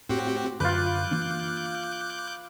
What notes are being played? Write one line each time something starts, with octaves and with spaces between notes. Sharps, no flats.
A2 C4 F#4 G4
F#2 D3 F4 B4 D6 F#6 G6
E3 A#3 D4